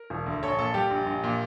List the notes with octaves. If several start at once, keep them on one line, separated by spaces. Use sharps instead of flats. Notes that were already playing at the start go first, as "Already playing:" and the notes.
Already playing: A#4
E1
D2
A#1 A4 C#5
A#2 A4
G3 G4
A#1
A#1
A#2